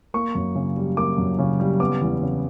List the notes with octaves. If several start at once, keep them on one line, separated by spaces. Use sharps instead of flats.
A#3 C#6
F#2
C#3
G3
A#3 D6
F#2
C#3
G3
B3 D6
E2
C#3